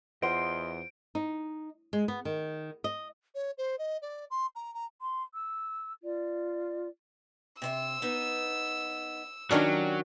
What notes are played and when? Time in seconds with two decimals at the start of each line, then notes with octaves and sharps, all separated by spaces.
0.22 E2 F4 C5 D#5 F#5 C6 D7
1.15 D#4
1.93 G#3
2.08 B3
2.25 D#3
2.84 D#5
3.35 C#5
3.58 C5
3.79 D#5
4.02 D5
4.31 C6
4.56 A#5
4.74 A#5
5.04 C6
5.33 E6
6.03 F4 D5
7.62 C3 C5 E5 E6
8.02 B3 D#4
9.51 D#3 F#3 C#4 D4 F4 G4 D5